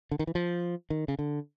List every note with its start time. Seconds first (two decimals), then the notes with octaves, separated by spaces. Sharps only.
0.11 D3
0.19 D#3
0.27 E3
0.35 F3
0.90 D#3
1.08 C#3
1.19 D3